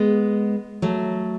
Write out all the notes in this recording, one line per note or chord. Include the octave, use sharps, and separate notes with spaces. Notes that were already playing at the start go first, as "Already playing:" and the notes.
Already playing: G#3 B3
F#3 A3